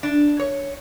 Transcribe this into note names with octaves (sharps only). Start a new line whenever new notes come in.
D4
C#5